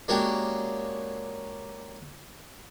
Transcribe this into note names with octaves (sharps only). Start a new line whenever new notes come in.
G#3 A#3 C#4 D4 F#4 G4